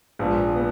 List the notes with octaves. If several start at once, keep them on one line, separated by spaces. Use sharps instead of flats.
A#1 G#2 F3 B3
B3